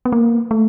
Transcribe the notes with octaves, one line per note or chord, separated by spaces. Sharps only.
B3
A#3
A3